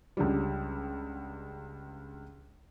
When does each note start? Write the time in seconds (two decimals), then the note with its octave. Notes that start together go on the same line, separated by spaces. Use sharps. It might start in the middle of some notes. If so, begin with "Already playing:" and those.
0.17 C#2 D3 G3